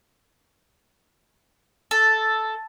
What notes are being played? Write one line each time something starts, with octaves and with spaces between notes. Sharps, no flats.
A4